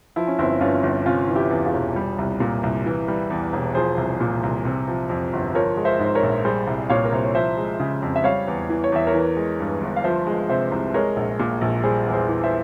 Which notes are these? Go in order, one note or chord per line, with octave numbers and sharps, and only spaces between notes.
F3 E4
C#4
G1 C4 E4
G2 C#4 F4
G1
C3 C#4 F4
E3
E4 G4
E2
F4 G#4
E1
G3
C2
A#2
C2
E3
G3
E2
E1
F3 G#4 C5
C2
A#2
C2
C3
F3
F2
G1
F3 A#4 C#5
G#3
C5 E5
G#2 C5
A#4 C#5
A#1
G3 G#4 C5
C2
A#2 C#5 F5
A#4
C2 C5
C#5
F3 C5 E5
G#3
C#3
F2
E5
G3 C#5 F5
E2
E3
C#5
E2 E5
A#4 C#5
E3
G#3
G2
G1
F5
F3 C5 E5
G#3
C3 C5 E5
C2
G#3 A#4 C#5
A#1
A#2
A#1
G3 G#4 C5
E2
G#4 C5
E3
C5 E5